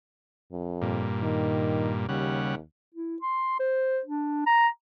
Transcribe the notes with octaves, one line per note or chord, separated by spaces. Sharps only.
F2
G2 A#2
D#3
D#2 C#3 G3 F#5
E4
C6
C5
D4
A#5